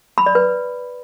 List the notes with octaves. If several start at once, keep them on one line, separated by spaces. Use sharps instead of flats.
B5
D5
B4